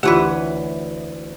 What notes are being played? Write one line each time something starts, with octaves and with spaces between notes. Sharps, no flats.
D2 E3 F4 G4 B4 C#5 F#5